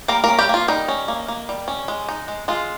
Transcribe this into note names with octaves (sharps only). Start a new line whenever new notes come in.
G3 A#3 A#4
A#3 C#4 A#4
G3 G4
A#3 F4
G3 D#4
C#4
A#3
A#3
G3
C#4
G#3
D#4
G#3
G#3 F4